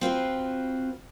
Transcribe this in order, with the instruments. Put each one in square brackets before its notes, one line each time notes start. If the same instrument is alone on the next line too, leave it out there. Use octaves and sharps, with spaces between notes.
[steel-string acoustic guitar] C4 F4 F#4 B4